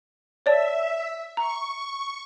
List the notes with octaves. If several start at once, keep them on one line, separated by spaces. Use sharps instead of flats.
C#5 D5 E5 A5
A#5 C#6